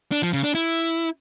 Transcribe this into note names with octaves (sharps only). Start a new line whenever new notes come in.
D4
F3
C#3
D4
E4